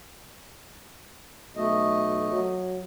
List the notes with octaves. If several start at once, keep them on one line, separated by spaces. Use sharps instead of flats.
B1 A3 D#5
F#3